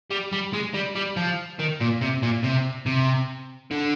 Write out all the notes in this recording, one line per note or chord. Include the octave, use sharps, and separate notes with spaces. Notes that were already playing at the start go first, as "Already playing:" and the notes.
G3
G3
G#3
G3
G3
F3
D#3
A#2
C3
A#2
C3
C3
D3